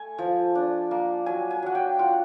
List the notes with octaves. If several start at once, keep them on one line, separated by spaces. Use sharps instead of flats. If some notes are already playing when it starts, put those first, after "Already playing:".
Already playing: A3 G#5
F3
D4
A#3
F#3 G#5
G#5
F#3 F#5
G5
F4 F#5